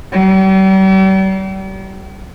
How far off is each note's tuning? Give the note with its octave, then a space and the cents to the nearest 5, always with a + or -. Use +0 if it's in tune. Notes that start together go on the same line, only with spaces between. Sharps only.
G3 -40